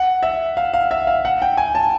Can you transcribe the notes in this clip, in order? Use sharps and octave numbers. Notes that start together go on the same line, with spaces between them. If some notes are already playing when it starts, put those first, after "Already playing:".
Already playing: F#5
E5
F5
F5
E5
F5
F#5
G5
G#5
A5